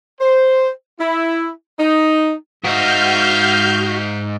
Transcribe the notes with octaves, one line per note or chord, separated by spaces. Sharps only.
C5
E4
D#4
G#2 D#4 F#4 E5 F5 F6 G6